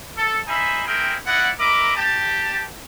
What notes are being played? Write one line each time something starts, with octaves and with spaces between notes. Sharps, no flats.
A4
D#4 C5 E5 G#5 B5
C4 E4 G#4 A#4 G5
E4 D5 D#5 F#5
A#4 D#5 E5 A#5 B5 D6
G4 A5